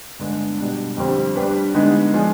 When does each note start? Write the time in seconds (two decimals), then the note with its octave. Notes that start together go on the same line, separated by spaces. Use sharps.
0.19 G2 D3 G#3 B3 D4
0.58 B2 G3 D4
0.97 F2 D3 G3 C4 G4
1.36 G3 D4 G4 B4
1.74 D3 G#3 B3 D#4 G4
2.14 F3 G#3 D4 G#4